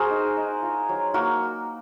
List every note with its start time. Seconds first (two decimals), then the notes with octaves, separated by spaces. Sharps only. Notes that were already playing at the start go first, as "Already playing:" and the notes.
Already playing: F#4 G#4 A#4 C5
0.10 D#4
0.37 D#4
0.62 F4
0.89 F#3
1.14 A#3 F#4 A#4